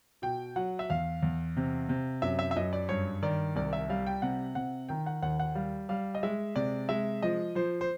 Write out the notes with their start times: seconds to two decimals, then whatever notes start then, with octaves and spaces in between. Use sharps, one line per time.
0.22 B2 G5
0.56 F#3 F#5
0.79 E5
0.90 E2 F5
1.22 E2
1.57 C3
1.89 C3
2.22 F#2 E5
2.39 E5
2.51 E5
2.56 F#2 D#5
2.73 D5
2.89 G2 C#5
3.23 D#3 D5
3.55 C2 D5
3.73 E5
3.89 G3 F5
4.06 G5
4.22 C3 F#5
4.55 C3 F#5
4.89 D#3 G5
5.06 F#5
5.22 D#2 F#5
5.40 F#5
5.55 G3 F5
5.89 G3 F5
6.15 D#5
6.23 G#3 E5
6.56 C3 D5
6.89 G#3 E5
7.22 F3 D#5
7.55 F3 C5
7.81 C5